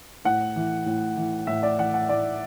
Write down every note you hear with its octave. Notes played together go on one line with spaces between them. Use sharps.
A2 F#5
E3
A2
E3
A2 E5
D5
E3 F#5
F#5
A2 D5